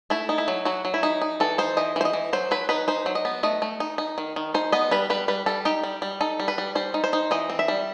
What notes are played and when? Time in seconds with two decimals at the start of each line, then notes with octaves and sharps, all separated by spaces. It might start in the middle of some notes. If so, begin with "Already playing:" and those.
0.10 A3 E4
0.29 D#4
0.38 E4
0.48 F#3
0.65 F#3 F#4
0.85 F#3
0.94 E4
1.03 D#4
1.22 D#4
1.40 E3 A4
1.58 D#4 C5
1.77 E3 D#5
1.96 E3 C5
2.05 D#5
2.13 E3
2.33 F#3 C5
2.51 F#3 B4
2.69 D#4 B4
2.88 D#4 C5
3.06 F#3
3.15 D#5
3.25 B3
3.43 A3 D#5
3.62 A3
3.80 D#4
3.98 D#4
4.18 D#3
4.36 D#3
4.54 D#4 C5
4.72 B3 D#5
4.91 G3 B4
5.10 G3 B4
5.28 G3 B4
5.46 G3 A4
5.65 D#4 G4
5.84 G3
6.02 G3
6.21 D#4 A4
6.40 G3
6.48 B4
6.58 G3
6.75 G3 C5
6.94 D#4
7.04 C5
7.13 D#4
7.31 E3 D#5
7.50 C4
7.59 E5
7.68 G3